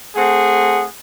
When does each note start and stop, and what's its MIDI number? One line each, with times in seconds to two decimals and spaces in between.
0.16 0.84 57
0.16 0.84 60
0.16 0.84 68
0.16 0.84 78